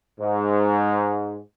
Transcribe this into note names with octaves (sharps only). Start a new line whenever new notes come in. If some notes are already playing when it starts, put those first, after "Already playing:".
G#2